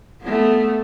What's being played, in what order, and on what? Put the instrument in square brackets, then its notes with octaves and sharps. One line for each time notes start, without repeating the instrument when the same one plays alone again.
[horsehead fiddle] A3 B3